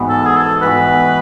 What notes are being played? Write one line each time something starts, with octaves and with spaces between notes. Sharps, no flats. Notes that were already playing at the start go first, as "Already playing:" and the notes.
Already playing: G#2 E3 B3 F#4
A4
G#4
A4
G#2 E3 B3 F#4 B4